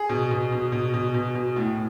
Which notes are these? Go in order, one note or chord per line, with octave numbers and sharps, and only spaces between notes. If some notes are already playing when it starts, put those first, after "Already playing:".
Already playing: G#4
B2
B2
B2
B2
B2
B2
B2
A2